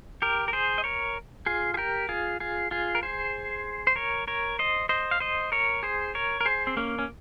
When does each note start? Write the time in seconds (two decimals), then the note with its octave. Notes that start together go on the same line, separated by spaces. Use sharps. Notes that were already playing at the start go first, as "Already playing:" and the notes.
0.22 G4 A#4
0.48 A#4
0.53 G#4 C5
0.78 D#5
0.84 A#4 C#5
1.46 F4 G#4
1.74 G#4
1.77 G4 A#4
2.09 F4 G#4
2.40 F4 G#4
2.71 F4 G#4
2.95 A#4
3.03 G#4 C5
3.87 C5
3.96 A#4 C#5
4.28 A#4 C#5
4.59 C5 D#5
4.89 C5 D#5
5.11 F5
5.20 C5 D#5
5.52 A#4 C#5
5.83 G#4 C5
6.15 A#4 C#5
6.41 A#4
6.45 G#4 C5
6.67 C4
6.77 A#3 C#4
6.99 C#4